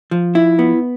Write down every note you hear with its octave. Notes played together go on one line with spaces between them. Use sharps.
F3
E4
B3